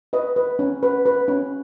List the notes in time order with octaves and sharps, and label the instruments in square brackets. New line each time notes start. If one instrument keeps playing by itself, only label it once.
[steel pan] B4 D#5
B4
C#4
B4
B4
C#4